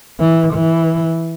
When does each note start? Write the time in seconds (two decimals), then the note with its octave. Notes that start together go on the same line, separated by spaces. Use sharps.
0.20 E3
0.54 E3